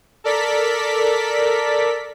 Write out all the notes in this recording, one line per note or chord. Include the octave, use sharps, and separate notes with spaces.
A4 A#4 D5 B6